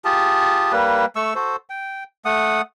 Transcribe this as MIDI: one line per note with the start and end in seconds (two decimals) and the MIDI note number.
0.05 0.72 65
0.05 0.72 67
0.05 0.72 68
0.05 0.72 81
0.72 1.06 55
0.72 1.06 58
0.72 1.06 71
1.16 1.34 57
1.16 1.34 85
1.16 1.34 88
1.35 1.56 66
1.35 1.56 69
1.35 1.56 72
1.70 2.04 79
2.25 2.61 57
2.25 2.61 78
2.25 2.61 87